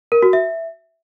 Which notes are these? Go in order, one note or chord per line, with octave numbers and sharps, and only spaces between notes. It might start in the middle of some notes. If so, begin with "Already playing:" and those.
A#4
F#4
E5